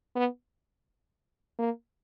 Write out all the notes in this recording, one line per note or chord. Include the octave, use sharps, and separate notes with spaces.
B3
A#3